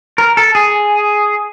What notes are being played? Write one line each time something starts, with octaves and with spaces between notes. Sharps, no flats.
A#4
A4
G#4